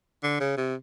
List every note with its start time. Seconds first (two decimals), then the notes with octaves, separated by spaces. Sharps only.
0.23 D3
0.40 C#3
0.57 C3